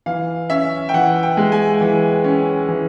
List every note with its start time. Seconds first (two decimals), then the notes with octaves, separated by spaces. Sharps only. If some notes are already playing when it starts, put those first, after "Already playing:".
0.06 E3 F5
0.50 C#4 E5
0.89 G5
0.94 E3 F#5
1.23 G5
1.37 G#3
1.52 G#5
1.81 E3
2.24 C#4
2.69 E3